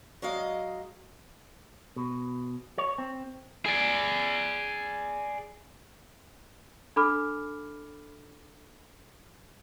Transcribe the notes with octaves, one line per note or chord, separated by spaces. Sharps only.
F#3 G#3 D#5 F5
B2
C#5
C4
G#4 D5
D4 A4 B5 D6 F6